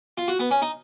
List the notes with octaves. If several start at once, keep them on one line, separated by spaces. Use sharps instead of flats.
F4
F#4
B3
C#4
D#4